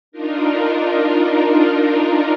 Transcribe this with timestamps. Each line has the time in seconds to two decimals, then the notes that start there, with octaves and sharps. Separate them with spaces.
0.12 D4 D#4 F4 A#4